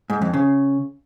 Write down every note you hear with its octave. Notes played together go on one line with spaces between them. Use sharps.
G#2
F2
C#3